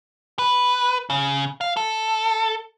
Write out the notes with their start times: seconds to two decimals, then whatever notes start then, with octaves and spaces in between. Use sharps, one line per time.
0.39 B4
1.10 C#3
1.61 F5
1.77 A4